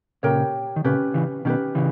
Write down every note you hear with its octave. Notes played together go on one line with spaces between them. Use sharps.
A#2 C#3 G4 A#4 C#5 G5
D#3
A#2 C#3 C#4 G4 B4
C#3 E3
B2 D#3 C#4 G4 B4
C#3 E3